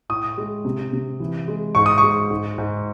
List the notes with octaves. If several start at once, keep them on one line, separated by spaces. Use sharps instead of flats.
A2 D#6
G#3
C3
C3
E3
G#3
G#2 C#6
D#6
C#6
G#3
G#2
G#2